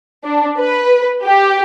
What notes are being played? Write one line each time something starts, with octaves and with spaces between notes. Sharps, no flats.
D4
B4
G4